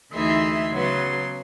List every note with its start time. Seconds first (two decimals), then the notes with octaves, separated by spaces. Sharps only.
0.12 D2 E3 D#4 G#4 E5 C6
0.72 C#3 F#3 B3 C6